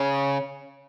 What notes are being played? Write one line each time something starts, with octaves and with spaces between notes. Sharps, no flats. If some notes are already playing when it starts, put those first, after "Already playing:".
Already playing: C#3 C#5